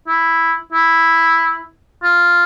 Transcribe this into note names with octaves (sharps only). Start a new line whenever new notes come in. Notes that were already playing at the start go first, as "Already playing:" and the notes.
E4
E4
F4